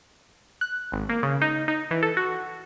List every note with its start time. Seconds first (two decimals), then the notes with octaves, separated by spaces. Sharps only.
0.61 F#6
0.92 G#1
1.09 A#3
1.23 C#3
1.41 D#4
1.68 D#4
1.91 E3
2.03 A4
2.17 F#4